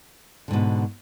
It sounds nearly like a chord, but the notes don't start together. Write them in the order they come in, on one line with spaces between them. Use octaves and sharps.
D3 G#2 B2